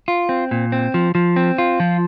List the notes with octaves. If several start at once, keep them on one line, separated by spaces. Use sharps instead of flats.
F4
C4
A#2
C4
F3
F3
C4
F4
F3